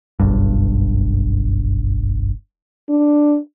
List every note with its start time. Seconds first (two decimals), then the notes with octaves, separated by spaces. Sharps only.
0.20 F#1 B1 G2
2.89 D4